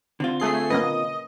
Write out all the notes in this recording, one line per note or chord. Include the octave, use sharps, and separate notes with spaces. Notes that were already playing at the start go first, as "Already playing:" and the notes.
D3 C4 F4
A3 G#4 C7
A#3 C#4 B4 D#5